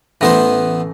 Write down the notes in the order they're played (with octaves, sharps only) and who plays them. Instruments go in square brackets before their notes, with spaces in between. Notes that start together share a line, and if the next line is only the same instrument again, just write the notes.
[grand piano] A1 A3 A#6 [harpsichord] E3 B3 C5